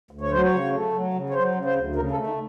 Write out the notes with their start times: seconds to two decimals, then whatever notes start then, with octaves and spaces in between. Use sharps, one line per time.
0.11 D2
0.21 C#5
0.31 F#3 C5
0.42 C#5
0.51 C#3
0.72 A3
0.93 F#3
1.14 C#3
1.30 C#5
1.34 F#3 C5
1.55 C#3
1.65 C5
1.75 D2
1.96 C#3 A#4
2.11 A4
2.16 A3
2.27 D#4